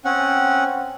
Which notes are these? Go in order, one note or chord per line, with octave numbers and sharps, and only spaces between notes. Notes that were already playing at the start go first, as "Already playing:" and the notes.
C4 C#4 F#5